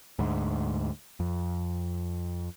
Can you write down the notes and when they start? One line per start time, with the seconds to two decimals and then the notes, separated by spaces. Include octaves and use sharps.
0.19 D2 G#2
1.20 F2